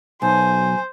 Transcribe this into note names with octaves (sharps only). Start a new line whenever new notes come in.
B1 C5 G#5